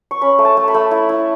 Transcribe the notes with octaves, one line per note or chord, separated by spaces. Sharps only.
C#6
C#4 B5
A3
A5
A3
B5
A3
E4
E4